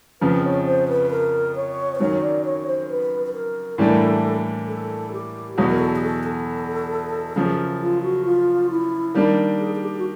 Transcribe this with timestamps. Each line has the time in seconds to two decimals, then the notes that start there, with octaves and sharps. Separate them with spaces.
0.21 F2 C#3 F3 B4
0.44 C#5
0.66 C5
0.88 B4
1.10 A#4
1.56 C#5
1.95 C5
2.00 F#2 D#3 F#3 C#5
2.22 D5
2.45 C#5
2.67 C5
2.89 B4
3.26 B4
3.34 A#4
3.78 A2 E3 G3 A#3 D4 A4
4.67 A4
5.12 G4
5.57 E2 B2 F#3 G#4
5.70 A#4
5.79 A4
5.96 G#4
6.02 A4
6.24 A4
7.35 F#2 C#3 F3 G#4
7.43 A4
7.49 G#4
7.80 F4
8.02 F#4
8.25 F4
8.70 E4
9.14 D#3 G3 A#3 D4
9.59 G#4
9.75 G#4
9.81 G4
9.99 F#4